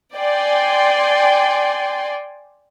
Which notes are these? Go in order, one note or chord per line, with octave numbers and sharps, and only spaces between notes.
D5 G5 G#5 C6